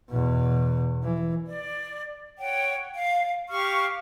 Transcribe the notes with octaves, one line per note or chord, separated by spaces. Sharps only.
E2 B2
E3
D5
C#5 F#5 G5
F5
G4 F5 C#6 F6